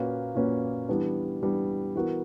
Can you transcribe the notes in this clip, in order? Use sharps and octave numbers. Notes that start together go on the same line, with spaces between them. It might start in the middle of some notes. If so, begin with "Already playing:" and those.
Already playing: A#2 A#3 C#4 F#4 B4
A#2 A#3 C#4 F#4 B4
E3 G3 B3 D4
E3 G3 B3 D4
E3 B3 F#4 A#4